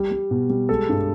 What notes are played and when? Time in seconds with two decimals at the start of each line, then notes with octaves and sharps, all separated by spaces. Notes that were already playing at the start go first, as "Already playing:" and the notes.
Already playing: G3
0.11 G3
0.31 B2
0.50 G3
0.69 G#3 A4
0.89 G2